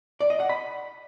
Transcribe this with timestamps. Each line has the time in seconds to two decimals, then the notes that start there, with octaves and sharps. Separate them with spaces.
0.20 D5
0.30 D#5
0.40 F#5
0.49 B5